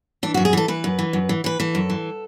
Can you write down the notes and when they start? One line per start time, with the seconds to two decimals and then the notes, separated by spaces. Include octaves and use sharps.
0.23 E3 D4
0.34 F#2 F#4
0.45 G#4
0.53 E3 A4
0.68 E3 B4
0.84 F#2
0.99 E3
1.13 F#2
1.29 E3
1.44 E3 B4
1.60 E3 A4
1.75 F#2
1.90 E3